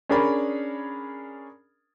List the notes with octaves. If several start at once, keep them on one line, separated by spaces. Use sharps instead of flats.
C#4 D4 G#4 A#4 D5 B5